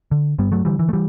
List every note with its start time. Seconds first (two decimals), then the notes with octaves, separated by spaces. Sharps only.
0.11 D3
0.39 G2 G3 B3
0.52 F#3 A3
0.65 D3 E3 G3
0.79 E3
0.89 A3
0.93 E3 G3